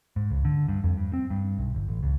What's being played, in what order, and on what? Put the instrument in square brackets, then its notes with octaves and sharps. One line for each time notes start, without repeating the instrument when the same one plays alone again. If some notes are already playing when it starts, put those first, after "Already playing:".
[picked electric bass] G#2
C#2
D3
G2
F2
G2
C4
G2
B1
G1
A1
C#2